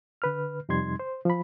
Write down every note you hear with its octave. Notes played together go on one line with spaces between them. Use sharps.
D3 B4 F6
F2 C3 G3 D#4 C6 G#6
C5
F3 B5